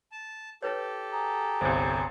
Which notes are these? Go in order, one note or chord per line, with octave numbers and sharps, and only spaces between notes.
A5
E4 G4 A4 B4 C#5
G#4 A#5
G1 C2 C5